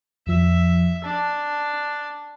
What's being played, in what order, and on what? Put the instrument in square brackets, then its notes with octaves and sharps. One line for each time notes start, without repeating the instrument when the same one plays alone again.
[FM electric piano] F2 F3 [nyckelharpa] E5
[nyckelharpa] D4 [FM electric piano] A5